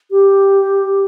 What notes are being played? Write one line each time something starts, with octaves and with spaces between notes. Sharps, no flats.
G4